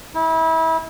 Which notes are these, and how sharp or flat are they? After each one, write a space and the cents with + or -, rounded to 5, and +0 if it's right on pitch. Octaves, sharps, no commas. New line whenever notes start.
E4 -30